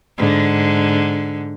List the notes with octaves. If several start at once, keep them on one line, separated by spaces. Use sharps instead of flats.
G#2 D3